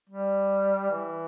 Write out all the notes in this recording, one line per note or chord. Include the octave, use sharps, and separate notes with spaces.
G3
E3